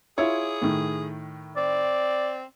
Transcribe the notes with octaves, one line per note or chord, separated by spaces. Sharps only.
E4 F4 G#4 C#5
A2 D#3
C4 D5